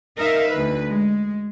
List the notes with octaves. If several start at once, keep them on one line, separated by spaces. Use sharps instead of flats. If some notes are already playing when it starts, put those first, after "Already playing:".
D#4 A#4 E5 F5
D2 B4
G#3